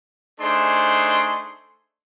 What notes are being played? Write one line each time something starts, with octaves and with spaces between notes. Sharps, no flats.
A3 D4 D#4 G#4 C5 C6